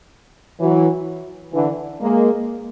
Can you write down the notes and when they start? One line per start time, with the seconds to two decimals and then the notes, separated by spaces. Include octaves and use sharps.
0.60 E3 F#3
1.54 D3 E3
2.01 G#3 A#3